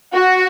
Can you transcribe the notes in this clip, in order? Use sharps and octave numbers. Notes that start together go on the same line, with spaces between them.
F#4